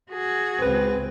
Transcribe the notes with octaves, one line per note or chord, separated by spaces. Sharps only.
F#4 G#4
C#2 C4 B4